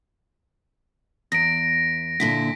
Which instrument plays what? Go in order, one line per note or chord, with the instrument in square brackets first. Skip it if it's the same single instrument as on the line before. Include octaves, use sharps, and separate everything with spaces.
[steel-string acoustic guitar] E2 [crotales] A#6 B6 D7
[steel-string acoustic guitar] A#2 D3 E4 [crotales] B6